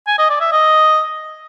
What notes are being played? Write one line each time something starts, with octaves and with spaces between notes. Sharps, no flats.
G#5
D#5
D5
E5
D#5